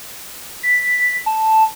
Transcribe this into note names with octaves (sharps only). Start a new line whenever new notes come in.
B6
A5